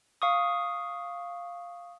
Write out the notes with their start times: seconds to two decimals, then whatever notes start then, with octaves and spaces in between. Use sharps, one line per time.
0.22 F5 C#6 D#6